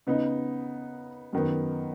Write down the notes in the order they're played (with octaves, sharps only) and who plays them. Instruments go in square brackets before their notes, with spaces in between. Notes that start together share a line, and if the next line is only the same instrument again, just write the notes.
[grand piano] C#3 B3 D#4
F#2 D#3 B3